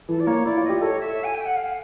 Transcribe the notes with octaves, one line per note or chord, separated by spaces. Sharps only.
E3 A4
D5
A#3 C#5
E4 D5
F4
D#5
G4
A4 C#5
E5
G#5
G5
F#5
F5